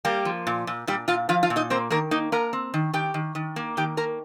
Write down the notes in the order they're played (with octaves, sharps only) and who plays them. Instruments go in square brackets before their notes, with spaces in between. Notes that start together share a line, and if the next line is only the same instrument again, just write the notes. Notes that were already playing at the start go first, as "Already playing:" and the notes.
[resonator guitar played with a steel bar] G3 A#3 G4
F3
A#2
A#2
A#2 G3 G4
A#2 F4 F5
F3 F4 F5
F4 F5
A#2
D#4 D#5
A#3 C4 C5
D#3 A#3 A#4
A#3 D#4 D#5
A#3 A#4 A#5
C4
D#3
D#3 G4 G5
D#3
D#3
A#3
D#3 G4 G5
A#3 A#4 A#5